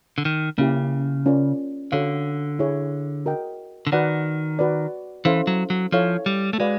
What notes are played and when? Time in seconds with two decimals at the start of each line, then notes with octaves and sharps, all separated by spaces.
0.18 D3
0.25 D#3
0.58 C#3 A#3 C#4 E4 G4
1.26 C#4 F4 A#4 D5
1.92 D3 F#4 A4 C#5 F5
2.59 E4 G#4 C#5
3.26 F#4 A#4 D#5 G5
3.87 D3
3.92 D#3 F#4 B4 D5 F#5
4.59 F#4 B4 D5
5.25 E3 C#4 E4 A4 C5 F5
5.47 F#3
5.70 F#3
5.92 F3 E4 A4 C#5 F5
6.26 G3
6.53 A3
6.59 G#3 F#4 B4 D5 F5